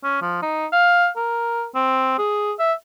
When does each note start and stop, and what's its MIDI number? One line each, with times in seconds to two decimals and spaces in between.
0.04 0.21 61
0.22 0.42 53
0.42 0.67 63
0.72 1.08 77
1.17 1.66 70
1.75 2.18 60
2.18 2.53 68
2.59 2.73 76